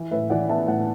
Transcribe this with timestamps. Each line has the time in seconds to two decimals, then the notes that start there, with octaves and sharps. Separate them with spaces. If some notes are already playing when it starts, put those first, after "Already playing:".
Already playing: E3
0.11 A2 B4 E5
0.30 E3 D5 F#5
0.49 B3 E5 A5
0.67 A2 D5 F#5